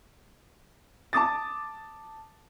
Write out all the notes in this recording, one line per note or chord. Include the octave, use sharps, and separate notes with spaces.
A5 D6 D#6 A6